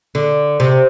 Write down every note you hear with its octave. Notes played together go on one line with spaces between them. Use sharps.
D3
C3